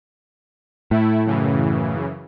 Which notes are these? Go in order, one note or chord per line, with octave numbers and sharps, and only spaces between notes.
A2 A3 E4
F#2 C#3 E3